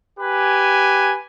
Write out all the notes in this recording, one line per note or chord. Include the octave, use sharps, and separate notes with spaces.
G4 B4 G#5